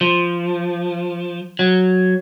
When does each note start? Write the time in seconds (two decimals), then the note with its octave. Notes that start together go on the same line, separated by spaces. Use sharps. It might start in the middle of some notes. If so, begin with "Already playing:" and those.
0.01 F3
1.59 F#3